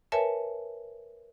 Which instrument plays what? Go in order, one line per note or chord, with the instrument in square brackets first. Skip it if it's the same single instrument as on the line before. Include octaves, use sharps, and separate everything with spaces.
[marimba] A#4 B4 C#5 E5 G#5 A5